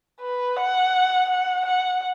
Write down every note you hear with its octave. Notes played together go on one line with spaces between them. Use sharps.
B4
F#5
F#5
F#5